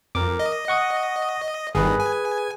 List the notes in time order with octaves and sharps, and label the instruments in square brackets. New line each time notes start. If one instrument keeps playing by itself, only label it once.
[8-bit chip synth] F2 [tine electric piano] A#4 D6
[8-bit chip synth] D#5
[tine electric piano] F#5 C#6 D#6
[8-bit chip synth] G1 G2 D#3 [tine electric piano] G#4 B4
[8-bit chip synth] G#5